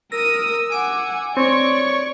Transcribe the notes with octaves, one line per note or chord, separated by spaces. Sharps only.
A#4 D#6 E6 A#6
F#5 G#5 D6
C4 C#5 D5 C#6